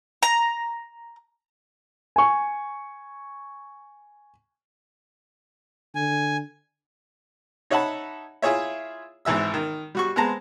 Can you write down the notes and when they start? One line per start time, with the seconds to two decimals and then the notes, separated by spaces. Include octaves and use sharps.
0.23 A#5
2.16 G#5 C#6
5.95 D3 G#5
7.70 D#4 C#5 E5 F#5 A5 B5
8.42 E4 F4 G#4 C#5 E5
9.25 G#1 G#2 E3 E5 E6
9.54 D#3
9.95 G3 F#4 C#6
10.16 G#3 B3 C4 A5 A#5